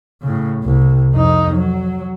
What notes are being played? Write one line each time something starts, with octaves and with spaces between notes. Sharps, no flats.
A2 C#3
C2
F2 D#4
F#3